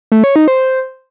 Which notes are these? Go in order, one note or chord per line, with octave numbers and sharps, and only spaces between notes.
A3
C#5
D#4
C5